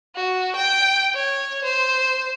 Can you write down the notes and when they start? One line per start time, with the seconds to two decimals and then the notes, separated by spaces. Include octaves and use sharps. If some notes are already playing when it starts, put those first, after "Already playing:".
0.16 F#4
0.56 G5
1.15 C#5
1.64 C5